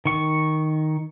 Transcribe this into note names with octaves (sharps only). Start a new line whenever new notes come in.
D#3 C#6